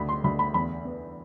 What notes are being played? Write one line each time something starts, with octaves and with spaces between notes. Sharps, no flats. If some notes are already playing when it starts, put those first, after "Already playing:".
Already playing: D2 B5
C6
D2 B5
B5
E2 B5
B3